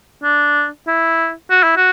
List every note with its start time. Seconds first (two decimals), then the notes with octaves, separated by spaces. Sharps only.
0.23 D4
0.87 E4
1.51 F#4
1.64 E4
1.77 F#4